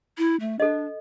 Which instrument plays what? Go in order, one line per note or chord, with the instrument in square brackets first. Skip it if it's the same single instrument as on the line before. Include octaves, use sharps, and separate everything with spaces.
[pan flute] E4
A3
[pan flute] D4 [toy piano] A4 D#5